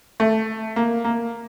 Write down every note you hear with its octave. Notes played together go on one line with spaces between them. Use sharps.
A3
A#3
A#3